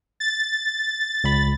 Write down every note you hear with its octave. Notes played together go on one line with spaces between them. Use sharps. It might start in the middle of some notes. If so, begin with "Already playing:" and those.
A6
C#2 B5